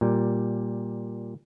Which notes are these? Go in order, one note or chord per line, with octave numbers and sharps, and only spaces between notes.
A#2 G3